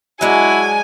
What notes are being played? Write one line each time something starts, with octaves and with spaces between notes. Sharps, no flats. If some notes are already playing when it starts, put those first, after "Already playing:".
F#3 G#3 D4 E4 F#4 G#5